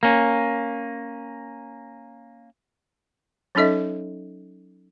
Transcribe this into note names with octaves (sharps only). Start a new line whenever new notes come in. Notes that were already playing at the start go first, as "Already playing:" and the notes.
A#3 C#4
F#3 C#4 D#4 A4 D#5 E5